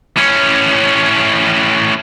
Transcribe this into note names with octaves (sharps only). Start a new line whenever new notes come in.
A2 C#4